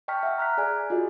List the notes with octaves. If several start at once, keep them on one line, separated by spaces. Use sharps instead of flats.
D#5 G5 A5 C#6 F6 B6
E5 F#5
A#5 F6 F#6 B6
G#4 D5 G#5
F4 F#4 G#4 D#5